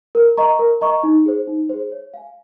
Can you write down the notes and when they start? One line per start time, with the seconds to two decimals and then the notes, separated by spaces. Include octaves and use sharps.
0.15 A#4
0.37 D#5 A#5 C#6
0.59 A#4
0.81 D#5 A#5 C#6
1.03 D#4
1.26 G#4 C5
1.48 D#4
1.69 G#4 C5
1.92 C#5
2.14 F5 G#5